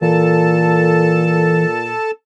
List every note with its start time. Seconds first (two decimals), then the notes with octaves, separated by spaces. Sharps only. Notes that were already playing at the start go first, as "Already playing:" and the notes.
0.02 A#2 E3 A4 A5